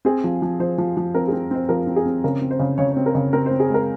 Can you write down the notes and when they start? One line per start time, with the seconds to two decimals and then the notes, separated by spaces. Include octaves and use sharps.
0.05 C4 G#4
0.24 F3
0.42 F3
0.60 F3 C5
0.78 F3
0.97 F3
1.14 C4 A#4
1.28 G#4
1.32 C4
1.51 C4 C5
1.69 F3 A#4
1.87 C4
1.96 G#4
2.06 C4
2.24 C#3 A#4
2.41 C4
2.51 C5
2.60 C#3
2.78 C#3 C#5
2.92 C#5
2.96 C4
3.06 A#4
3.15 C#3
3.33 C4 A#4
3.46 C5
3.51 C4
3.60 G#4
3.69 G#3 A#4